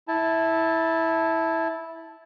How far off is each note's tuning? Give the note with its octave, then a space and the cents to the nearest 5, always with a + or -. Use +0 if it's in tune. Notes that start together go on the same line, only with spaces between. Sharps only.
E4 -10 A5 +0